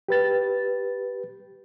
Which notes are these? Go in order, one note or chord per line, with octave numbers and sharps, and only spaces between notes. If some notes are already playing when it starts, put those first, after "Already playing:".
G4 B4 A6